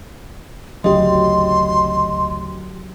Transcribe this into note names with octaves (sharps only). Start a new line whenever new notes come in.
G#1 D2 C#3 F#3 G4 D#5 C6